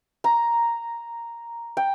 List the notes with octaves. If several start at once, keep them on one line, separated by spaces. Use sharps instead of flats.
A#5
G5